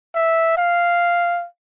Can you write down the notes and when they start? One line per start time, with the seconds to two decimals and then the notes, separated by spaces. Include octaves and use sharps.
0.15 E5
0.58 F5